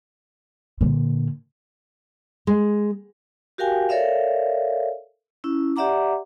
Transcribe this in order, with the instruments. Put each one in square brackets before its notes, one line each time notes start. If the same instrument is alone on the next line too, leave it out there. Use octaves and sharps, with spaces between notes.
[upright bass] A#2 D3
[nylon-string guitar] G#3
[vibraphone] F#4 G4 A#4 F5 G5 G#5
A4 A#4 C#5 D5 E5 F5
C#4 E4
G4 D5 E5 F#5 A#5 D6